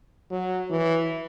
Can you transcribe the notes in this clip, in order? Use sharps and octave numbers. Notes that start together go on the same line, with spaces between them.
F#3
E3